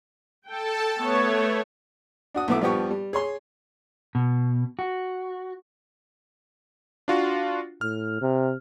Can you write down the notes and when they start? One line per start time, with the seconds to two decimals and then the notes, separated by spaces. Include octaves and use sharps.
0.47 A4 G5 A5
0.98 A3 B3 C#5
2.34 D4 F#4 D#6
2.48 B1 A3 B3 E4 D6
2.61 G2 F3 B3 G4 C#6
2.91 G3
3.13 G#4 C#5 C6
4.15 B2
4.79 F#4
7.08 D4 F4 F#4
7.81 A2 F6
8.21 C3